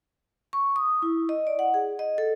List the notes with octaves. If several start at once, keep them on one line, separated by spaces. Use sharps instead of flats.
C#6
D#6
E4
D#5
D5
F#5
G#4
D#5
A4